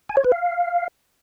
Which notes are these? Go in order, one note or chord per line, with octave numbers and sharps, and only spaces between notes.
G#5
C#5
B4
F5